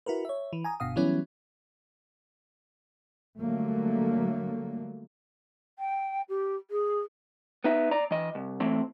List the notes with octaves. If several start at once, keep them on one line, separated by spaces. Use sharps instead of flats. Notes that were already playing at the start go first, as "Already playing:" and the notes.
E4 F#4 A#4 B4
C#5 E5
E3
G#5 A#5 D#6
G1 B2 F5 D#6
E3 F#3 G3 B3 C#4 E4
D3 F#3 G3 A3 A#3
G5
G4
G#4
B3 D#4 E5
D5 A#5
E3 D#5
C2
E3 A3 C4